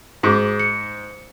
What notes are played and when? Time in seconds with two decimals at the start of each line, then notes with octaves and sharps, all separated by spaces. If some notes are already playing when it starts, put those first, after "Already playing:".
0.23 G#2 F#4 G#4 D6
0.60 C#7